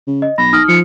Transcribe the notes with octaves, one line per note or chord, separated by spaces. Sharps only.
C#3
D#5
B1 B5 A#6
D#4 D#6 F6
F3 C#7